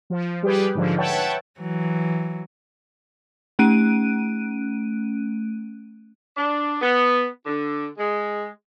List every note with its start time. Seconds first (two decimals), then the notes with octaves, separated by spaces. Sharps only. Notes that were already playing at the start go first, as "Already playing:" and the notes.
0.10 F3
0.43 G3 G4 G#4 B4
0.75 G#2 D3 F3
0.98 B4 C#5 E5 F#5 G5 A5
1.60 E3 F#3
3.59 A3 C#4 F#6 D7 D#7
6.36 D4
6.81 B3
7.46 D3
7.97 G#3